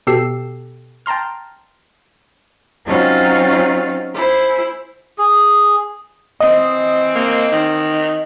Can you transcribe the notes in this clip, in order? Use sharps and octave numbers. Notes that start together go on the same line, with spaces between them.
B2 G4 A4 E6 C7
G5 A5 A#5 C6 F6
F#3 C4 C#4 D#4 F4
E4 G#4 C5
G#4
E3 C4 D#5
A#3
D#3